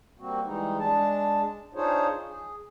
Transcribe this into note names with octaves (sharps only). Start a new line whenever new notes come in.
G3 A#3 C4 F#4
E3 G3 G#3 D#4
G#3 D4 A5
D4 D#4 F4 G#4 C5 C#5
G#4